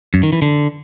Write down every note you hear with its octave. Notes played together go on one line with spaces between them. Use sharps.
F#2
D#3
E3
D3